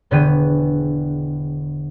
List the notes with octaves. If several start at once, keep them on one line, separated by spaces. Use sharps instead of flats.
E1 D3 B3 G#4 G5 D#7